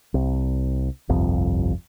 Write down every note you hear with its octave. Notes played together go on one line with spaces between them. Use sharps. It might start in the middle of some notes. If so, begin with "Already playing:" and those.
C2
G1 C2 F2